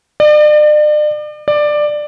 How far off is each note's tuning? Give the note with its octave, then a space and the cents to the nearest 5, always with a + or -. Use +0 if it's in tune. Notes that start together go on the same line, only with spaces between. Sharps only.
D5 +40
D5 +15